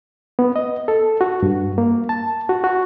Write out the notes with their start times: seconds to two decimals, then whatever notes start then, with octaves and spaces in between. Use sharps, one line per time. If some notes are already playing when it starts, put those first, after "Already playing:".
0.39 B3
0.56 D#5
0.88 A4
1.21 F#4
1.43 G2
1.78 A#3
2.09 A5
2.49 F#4
2.64 F#4